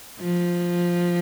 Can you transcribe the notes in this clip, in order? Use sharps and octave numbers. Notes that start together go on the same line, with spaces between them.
F3